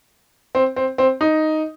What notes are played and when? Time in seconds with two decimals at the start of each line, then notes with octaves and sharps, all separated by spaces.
0.55 C4
0.76 C4
0.98 C4
1.21 D#4